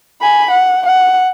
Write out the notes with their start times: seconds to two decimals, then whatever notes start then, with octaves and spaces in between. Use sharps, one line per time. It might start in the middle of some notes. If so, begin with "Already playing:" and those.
0.22 G#5 B5
0.51 F#5
0.86 F#5